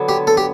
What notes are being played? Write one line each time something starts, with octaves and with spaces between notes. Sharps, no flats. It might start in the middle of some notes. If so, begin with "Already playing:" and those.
Already playing: D3 F#3 B3
G4
A4
G4